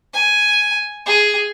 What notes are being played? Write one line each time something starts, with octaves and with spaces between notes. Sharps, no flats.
G#5
G#4